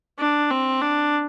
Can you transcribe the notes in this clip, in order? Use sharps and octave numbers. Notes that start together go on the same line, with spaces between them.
D4
C4
D4